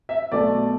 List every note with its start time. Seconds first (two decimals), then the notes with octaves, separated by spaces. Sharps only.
0.09 E5
0.32 B1 B2 A3 D5